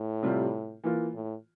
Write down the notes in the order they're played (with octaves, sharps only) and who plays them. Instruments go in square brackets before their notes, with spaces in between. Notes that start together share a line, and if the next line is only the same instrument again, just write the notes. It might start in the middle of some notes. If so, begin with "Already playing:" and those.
Already playing: [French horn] A2
[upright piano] C3 G3 C4 F4
E3 A#3 F4
[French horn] A2